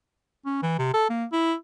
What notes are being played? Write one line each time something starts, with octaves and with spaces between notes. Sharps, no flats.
C#4
E3
C3
A4
A#3
E4